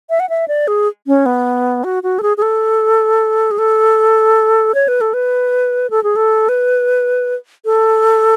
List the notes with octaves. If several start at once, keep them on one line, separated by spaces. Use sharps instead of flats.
E5
F#5
E5
D5
G#4
C#4
B3
F#4
F#4
A4
G#4
G#4
A4
G#4
A4
C#5
B4
A4
B4
A4
G#4
A4
B4
A4